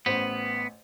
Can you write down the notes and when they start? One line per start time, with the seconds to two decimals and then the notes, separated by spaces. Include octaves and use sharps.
0.06 A1 B3 C5